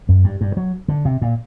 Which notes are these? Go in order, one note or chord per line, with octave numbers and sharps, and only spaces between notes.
F#2
G2
G2
F#3
D3
C3
A#2